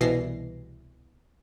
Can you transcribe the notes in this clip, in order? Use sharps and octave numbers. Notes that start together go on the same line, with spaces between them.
C2 B2 E3 A#6 C7